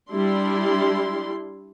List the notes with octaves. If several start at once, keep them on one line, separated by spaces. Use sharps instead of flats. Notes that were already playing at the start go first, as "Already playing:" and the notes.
G3 D4 E4 C6